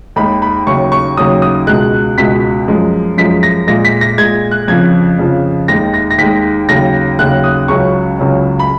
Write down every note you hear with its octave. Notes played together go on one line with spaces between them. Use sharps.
D#2 D#3 G#3 B5
B5
D#2 C#3 F#3 C#6
C#6
D#2 C#3 F#3 D#6
D#6
C#2 B2 G#3 F#6
C#2 B2 G#3 B6
F#2 F3 G#3
F#2 F3 G#3 B6
A#6
A#2 G#3 A#6
B6
A#6
A#2 G#3 G#6
F#6
F2 C#3 F3 G#6
F2 C#3 F3
D#2 D#3 G#3 A#6
A#6
A#6
D#2 D#3 G#3 B6
D#2 C#3 F#3 A#6
D#2 C#3 F#3 F#6
D#6
C#2 C#3 F#3 C#6
C#2 C#3 F#3
B5